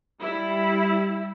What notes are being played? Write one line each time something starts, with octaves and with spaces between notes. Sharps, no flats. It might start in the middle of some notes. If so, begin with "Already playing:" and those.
G3 E4